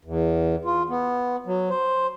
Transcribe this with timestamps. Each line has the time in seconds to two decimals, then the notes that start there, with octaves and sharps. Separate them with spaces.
0.05 E2
0.65 F4
0.89 B3
1.47 F#3
1.70 C5